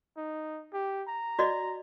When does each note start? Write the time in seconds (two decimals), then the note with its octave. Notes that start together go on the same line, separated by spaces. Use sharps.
0.17 D#4
0.73 G4
1.07 A#5
1.39 F#4 D5 D#5